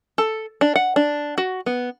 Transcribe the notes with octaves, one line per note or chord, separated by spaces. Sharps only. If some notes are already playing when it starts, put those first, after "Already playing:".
A4
D4
F#5
D4
F#4
B3